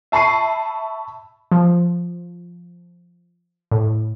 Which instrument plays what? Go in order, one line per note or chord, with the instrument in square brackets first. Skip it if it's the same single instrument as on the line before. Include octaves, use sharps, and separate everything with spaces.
[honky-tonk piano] E5 A5 B5 C#6 C7 D#7
[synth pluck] F3
A2